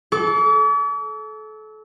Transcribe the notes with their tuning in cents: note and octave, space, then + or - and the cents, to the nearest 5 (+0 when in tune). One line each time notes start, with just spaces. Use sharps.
A4 -30 D6 -45